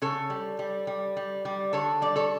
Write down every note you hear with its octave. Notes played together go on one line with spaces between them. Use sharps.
C#3 A4 C#5
G3
G3
G3
G3
G3
D3 A4 C#5
G3 D5
A4 C#5